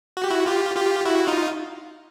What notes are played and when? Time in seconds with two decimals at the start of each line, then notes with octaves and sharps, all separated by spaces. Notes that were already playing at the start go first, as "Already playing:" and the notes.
0.17 F#4
0.24 G4
0.30 E4 F#4
0.46 F4 G4
0.76 F4 G4
1.05 E4 F#4
1.27 D#4 F4